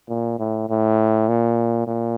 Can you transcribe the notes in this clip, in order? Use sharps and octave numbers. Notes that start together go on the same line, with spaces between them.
A#2
A2
A2
A#2
A#2